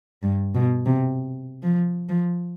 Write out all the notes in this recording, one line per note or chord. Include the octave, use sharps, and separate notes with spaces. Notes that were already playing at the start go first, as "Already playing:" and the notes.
G2
B2
C3
F3
F3